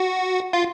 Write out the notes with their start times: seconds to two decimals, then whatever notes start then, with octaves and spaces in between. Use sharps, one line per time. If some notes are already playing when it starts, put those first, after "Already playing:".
Already playing: F#4
0.53 F4